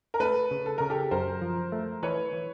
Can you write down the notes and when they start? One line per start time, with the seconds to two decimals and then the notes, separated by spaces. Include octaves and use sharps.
0.14 A#4
0.20 A3 A4 B4
0.51 C#3
0.66 A4
0.78 C#3 A#4
0.90 G4 A4
1.11 F#2 A#4 C5
1.42 F3
1.72 A3
2.03 E3 B4 C#5
2.33 E3